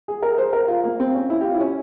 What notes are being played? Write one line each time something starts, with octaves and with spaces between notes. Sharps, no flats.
G#4
A#4
C5
A#4
F4
A#3
C4
C#4
E4
G4
F4
E4
C#4